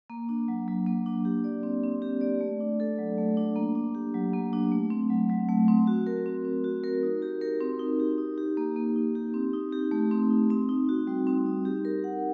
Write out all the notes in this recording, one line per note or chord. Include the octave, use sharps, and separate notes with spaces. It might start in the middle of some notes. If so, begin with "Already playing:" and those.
A#3
D4
F#3
F#3
A#3
D4
G4
D5
C4
C4
G4
D5
A3
D4
A4
F#3
A3
D4
A#3
D4
G4
F#3
A#3
D4
A3
C4
F#3
F#3
A3
C4
F#4
A#4
C4
C4
F#4
A#4
D#4
G4
A#4
C4
D#4
G4
D#4
G4
A#3
A#3
D#4
G4
C4
D#4
G4
A3
C4
D#4
C4
D#4
F#4
G3
C4
D#4
G4
A#4
F#5